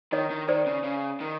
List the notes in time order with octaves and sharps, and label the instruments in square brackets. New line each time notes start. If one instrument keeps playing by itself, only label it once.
[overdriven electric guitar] D#3 [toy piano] C#5 D#5
[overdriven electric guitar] D#3
[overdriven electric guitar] D#3 [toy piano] C5 D5
[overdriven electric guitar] C#3
C#3
D#3